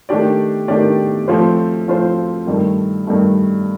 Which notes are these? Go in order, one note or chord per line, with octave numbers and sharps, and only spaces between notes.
D#3 A3 D4 G4 D5
D#3 A3 D4 G4 D5
F3 A3 C4 F4 C5
F3 A3 C4 F4 C5
G2 D#3 A3
G2 D#3 A3